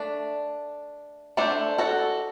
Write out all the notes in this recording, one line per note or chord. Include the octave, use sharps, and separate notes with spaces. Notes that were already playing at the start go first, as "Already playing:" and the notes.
Already playing: A3 D4
A3 D4 A4 C5
F#4 A4